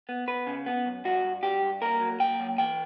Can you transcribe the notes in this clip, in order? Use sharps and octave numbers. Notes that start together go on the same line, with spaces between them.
B3
B3 B4
C#3
B3
F#2
G2 F#4
G2
G2 G4
G2
A#3 A#4
F#3
A#3 G5
F#3
E3 G5